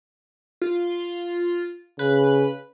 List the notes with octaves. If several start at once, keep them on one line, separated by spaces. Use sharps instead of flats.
F4
C#3 B4